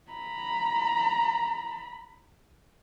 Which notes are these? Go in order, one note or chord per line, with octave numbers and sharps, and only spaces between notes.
A#5 B5